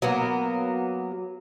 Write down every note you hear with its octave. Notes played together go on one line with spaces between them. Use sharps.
F#3 A#3 B3